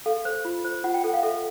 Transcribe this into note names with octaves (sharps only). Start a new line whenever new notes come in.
A4 F5
C5
F4
C5
F4 F#5
G5
A4 F#5
F5
A4 E5